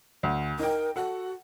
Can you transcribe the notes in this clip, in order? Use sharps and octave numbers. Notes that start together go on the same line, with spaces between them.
D2
D#4 A#4 G5
F#4 A4 F#5